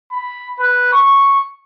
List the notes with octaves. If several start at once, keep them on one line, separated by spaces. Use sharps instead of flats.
B5
B4
C#6